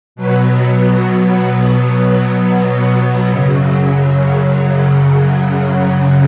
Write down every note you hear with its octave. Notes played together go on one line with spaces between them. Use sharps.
B2 F#3 B3
F#2 C#3 F#3